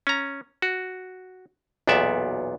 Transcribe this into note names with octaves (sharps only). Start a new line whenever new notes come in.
C#4 A#5
F#4
B1 E2 A#2 B3 D5 E5